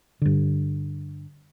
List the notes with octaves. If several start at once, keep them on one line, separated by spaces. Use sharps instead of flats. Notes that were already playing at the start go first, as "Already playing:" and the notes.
G2 D3